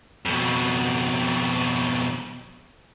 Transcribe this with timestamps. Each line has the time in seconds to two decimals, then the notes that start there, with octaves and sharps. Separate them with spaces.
0.25 F2 B2